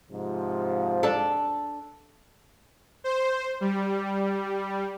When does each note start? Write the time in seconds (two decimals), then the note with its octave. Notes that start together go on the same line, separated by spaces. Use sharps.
0.11 G#2 C3 F3
1.03 D4 A4
3.04 C5
3.61 G3